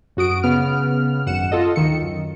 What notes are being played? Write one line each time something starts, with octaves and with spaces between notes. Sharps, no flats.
F#2 F#4 D#6 D7
C#3 B3 F6
G#1 F#2 F#5 C#7 E7
F4 A4 D#5
D2 D#3 C#7
F#2